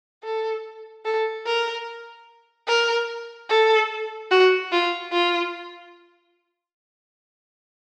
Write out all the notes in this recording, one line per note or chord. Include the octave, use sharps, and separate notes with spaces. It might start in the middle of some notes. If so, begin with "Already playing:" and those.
A4
A4
A#4
A#4
A4
F#4
F4
F4